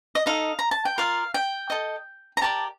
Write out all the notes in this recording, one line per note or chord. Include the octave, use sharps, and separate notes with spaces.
D#5
D#4 A4 D#5 F5
A#5
A5
G5
F4 A#4 D5 F5
G5
A4 D#5
A#5
G4 A#4 D5 A5